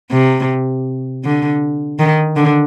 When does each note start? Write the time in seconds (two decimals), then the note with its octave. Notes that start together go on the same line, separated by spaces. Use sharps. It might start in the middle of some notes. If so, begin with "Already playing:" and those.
0.11 C3
1.24 D3
1.99 D#3
2.36 D3